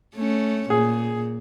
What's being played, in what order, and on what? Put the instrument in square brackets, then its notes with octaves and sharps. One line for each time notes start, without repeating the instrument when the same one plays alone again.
[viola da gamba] A3 C#4
[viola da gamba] A#2 [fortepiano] G#4